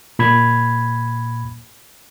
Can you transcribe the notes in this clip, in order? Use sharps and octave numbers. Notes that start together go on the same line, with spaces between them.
A#2 B5 G#6